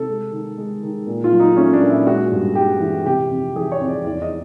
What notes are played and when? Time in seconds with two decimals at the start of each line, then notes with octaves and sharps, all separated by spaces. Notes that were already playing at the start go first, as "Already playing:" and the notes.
Already playing: C3 A4
0.08 G#3
0.32 D#3
0.58 G#3
0.82 D#3
1.07 A#2
1.24 F4
1.32 F#3
1.40 D#4
1.56 A3 C#4
1.73 D4
1.81 A#2
1.89 E4
2.07 G#3 F#4
2.32 G2
2.55 G#3 G4
2.80 E3
3.06 C3 G4
3.30 F2
3.56 E3 G#4
3.72 C#5
3.80 F2
3.89 D5
4.05 E2 D5
4.22 D#5